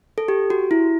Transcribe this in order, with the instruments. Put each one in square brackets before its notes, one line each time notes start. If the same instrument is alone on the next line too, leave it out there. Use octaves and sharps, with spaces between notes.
[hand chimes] A4
G4
F#4
E4